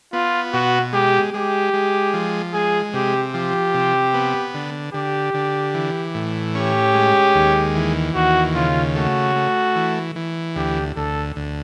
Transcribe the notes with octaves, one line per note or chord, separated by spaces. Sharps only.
B3 F4
B2 F#4
G#3 G4
G#3 G4
G#3
F3
G#3 G#4
C3 G4
F3 G4
C3
B3
D3
D3 G4
D3
E3
A2
C#4 G4
G#3
D#2
E3
D#2 F#4
C#3 F4
A3 F#4
A3
E3
E3
D2 G4
D2 A4
D2